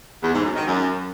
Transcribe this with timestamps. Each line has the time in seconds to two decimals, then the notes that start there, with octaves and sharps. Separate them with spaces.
0.23 E2
0.34 G#2
0.45 F#2
0.56 D#3
0.67 F#2